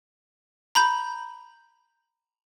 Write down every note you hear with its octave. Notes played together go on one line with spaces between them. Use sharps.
A#5 B5 G6